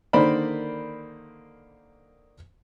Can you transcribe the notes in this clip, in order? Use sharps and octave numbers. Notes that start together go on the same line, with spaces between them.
D3 D#3 A#3 C5 D5 B5